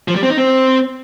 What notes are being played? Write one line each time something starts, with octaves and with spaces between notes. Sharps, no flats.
F3
G3
C4
D#4
C4